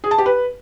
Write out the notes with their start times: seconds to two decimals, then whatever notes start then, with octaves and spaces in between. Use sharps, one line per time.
0.04 G#4
0.11 A5
0.18 G4
0.26 B4